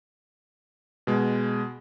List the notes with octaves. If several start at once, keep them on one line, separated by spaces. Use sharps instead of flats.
B2 G#3